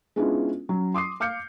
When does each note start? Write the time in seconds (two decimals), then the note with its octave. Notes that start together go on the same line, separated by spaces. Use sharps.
0.16 G#3 B3 C#4 D4 E4 F4
0.69 F#3 C#4
0.94 C6 D6 D#6 C7
1.20 F5 D6 F6 G6 C#7